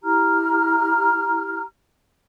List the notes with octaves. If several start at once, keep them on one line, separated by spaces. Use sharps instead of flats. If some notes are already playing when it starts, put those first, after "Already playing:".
E4 G4 A#5 F6